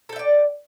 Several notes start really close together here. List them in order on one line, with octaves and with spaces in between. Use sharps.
A4 G5 E5 D5